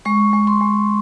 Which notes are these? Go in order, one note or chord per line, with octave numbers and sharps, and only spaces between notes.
G#3 C#6
G#3
C6
G#3